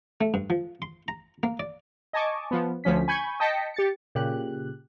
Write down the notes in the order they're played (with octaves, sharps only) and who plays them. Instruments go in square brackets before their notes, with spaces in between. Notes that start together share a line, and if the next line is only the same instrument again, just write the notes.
[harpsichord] A3
G2
F3
C6
A#5
A#3
D5
[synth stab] D#5 G#5 A5 C#6 D6
F3 B3
D2 F3 C#4 B6
G#5 B5 C#6 G6 G#6
D#5 G5 A5 A#6 B6 C#7
G4 A6 C#7
[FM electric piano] A#2 C#3 G4 F#6